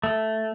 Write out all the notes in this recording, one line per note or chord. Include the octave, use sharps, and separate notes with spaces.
A3